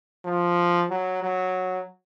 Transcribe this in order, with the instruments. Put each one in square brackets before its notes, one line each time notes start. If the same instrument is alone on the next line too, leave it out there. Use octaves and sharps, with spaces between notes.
[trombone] F3
F#3
F#3